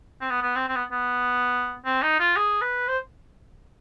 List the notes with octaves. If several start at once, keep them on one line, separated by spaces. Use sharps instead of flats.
C4
B3
B3
C4
C4
B3
B3
C4
D#4
F4
G#4
B4
C5